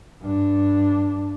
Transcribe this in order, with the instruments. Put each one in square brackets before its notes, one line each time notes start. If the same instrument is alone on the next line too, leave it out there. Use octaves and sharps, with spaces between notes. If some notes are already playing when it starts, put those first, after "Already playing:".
[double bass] G2 D4